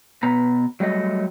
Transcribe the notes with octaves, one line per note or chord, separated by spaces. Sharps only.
B2 B3 A#5
F#3 G3 A3 D#5